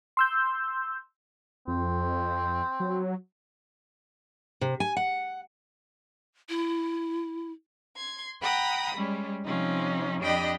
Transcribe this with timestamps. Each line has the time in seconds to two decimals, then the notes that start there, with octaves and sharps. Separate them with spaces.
0.17 C6 E6 G6
1.68 F2 C4
2.80 F#3
4.61 C3
4.80 G#5
4.97 F#5
6.49 E4
7.96 C6 G#6
8.42 F#5 G5 A#5 B5 D#6
8.96 G3 G#3 C#4
9.45 C3 F3 C#4 D#4
10.22 F2 D4 G4 D#5 G5 B5